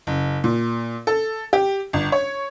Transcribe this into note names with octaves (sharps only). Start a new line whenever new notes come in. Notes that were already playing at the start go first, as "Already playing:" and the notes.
F#1
A#2
A4
G4
G1
C#5